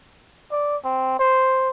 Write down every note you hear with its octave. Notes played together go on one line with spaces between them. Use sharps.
D5
C4
C5